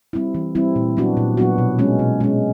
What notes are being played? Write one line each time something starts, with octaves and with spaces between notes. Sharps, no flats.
G3 C4 E4
E3
G3 C4 E4
A#2
F#3 B3 D4 F#4
A#2
F#3 B3 D4 F#4
B2
G#3 C#4
B2
G#3 C#4